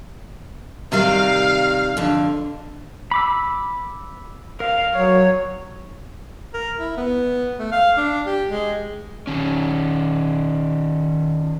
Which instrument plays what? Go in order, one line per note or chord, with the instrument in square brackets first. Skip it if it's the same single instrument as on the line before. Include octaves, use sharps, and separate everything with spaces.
[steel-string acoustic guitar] C3 D#3 G3 [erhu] F5
[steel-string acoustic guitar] F2 D3
[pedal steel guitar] B5 D6 E6
[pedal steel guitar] A#4 [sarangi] F5
[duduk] F#3 [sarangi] C#5
[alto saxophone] A#4
E4
B3
A3
F5
D4
G4
G#3
[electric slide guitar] D#3 C#4